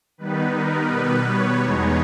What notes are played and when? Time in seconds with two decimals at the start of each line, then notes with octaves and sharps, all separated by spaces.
0.18 D#3 G3 B3 D#4 B4
0.53 A#4
0.88 B2 G3 B3 B4
1.25 C#5
1.60 E2 B2 G#3 B3 D#4